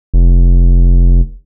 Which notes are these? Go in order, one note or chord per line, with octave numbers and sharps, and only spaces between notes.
F1